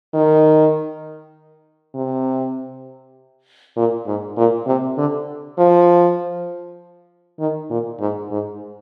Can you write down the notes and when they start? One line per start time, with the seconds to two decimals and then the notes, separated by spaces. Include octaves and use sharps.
0.14 D#3
1.95 C3
3.77 A#2
4.06 G#2
4.37 A#2
4.67 C3
4.98 D3
5.58 F3
7.39 D#3
7.70 A#2
8.00 G#2
8.31 G#2